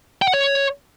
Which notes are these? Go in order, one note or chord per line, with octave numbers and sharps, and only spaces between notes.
G5
F#5
C#5